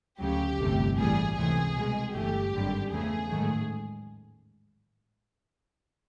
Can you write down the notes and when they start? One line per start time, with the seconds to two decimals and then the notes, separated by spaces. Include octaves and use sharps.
0.19 D2 C#3 F#3 G4
0.58 G1 F2 C3 E3 A3
0.97 A#1 A2 E3 G3 G#4
1.36 C#2 C3 E3 A3 G#4
1.75 C2 B2 G#3
2.13 G1 G2 E3 A3 G4
2.52 G#1 F#2 D3 G3
2.91 E2 C#3 F3 A3 G#4
3.30 A1 G#2 D#3 F#3 A3